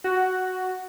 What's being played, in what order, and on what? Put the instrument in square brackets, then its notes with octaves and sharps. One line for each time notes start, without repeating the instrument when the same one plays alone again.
[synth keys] F#4